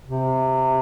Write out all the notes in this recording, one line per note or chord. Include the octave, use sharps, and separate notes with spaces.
C3